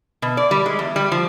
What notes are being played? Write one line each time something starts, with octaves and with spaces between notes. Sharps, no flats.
B2
D5
G3
G#3
E2
G3
F3